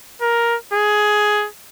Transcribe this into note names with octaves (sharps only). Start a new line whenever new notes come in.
A#4
G#4